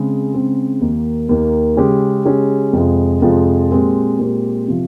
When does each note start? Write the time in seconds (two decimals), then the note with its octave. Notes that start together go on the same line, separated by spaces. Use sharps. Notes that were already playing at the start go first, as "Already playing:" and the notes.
Already playing: C#3 G#3 C4
0.34 C#3 G#3 C4
0.81 D#2 D#3 A#3
1.29 D#2 D#3 A#3
1.77 C#3 G#3 C#4 G4
2.25 C#3 G#3 C#4 G4
2.73 F2 C3 F3 G#3
3.22 F2 C3 F3 G#3
3.71 A#2 G#3 C4 G4 A#4
4.19 A#2 G#3 C4 G4 A#4
4.68 C3 F3